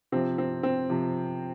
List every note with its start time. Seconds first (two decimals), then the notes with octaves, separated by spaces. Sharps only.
0.12 C3 F3 C4
0.38 C4
0.63 C4
0.90 C3 F3